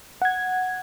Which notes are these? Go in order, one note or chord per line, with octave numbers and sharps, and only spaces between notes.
F#5 G#6